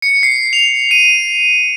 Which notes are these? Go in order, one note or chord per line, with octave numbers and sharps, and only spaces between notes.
C#7
C7
F7
D#7